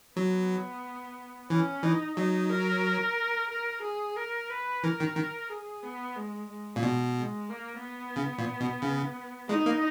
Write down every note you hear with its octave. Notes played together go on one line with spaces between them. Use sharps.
F#3 B3
E3 C#4
E3 D#4
F#3 D#4
A#4
A#4
G#4
A#4
B4
E3 A#4
D#3
D#3
G#4
B3
G#3
G#3
A#2
B2
G#3
A#3
B3
C#3
A#2
B2
C#3
G#3 D#4
A#3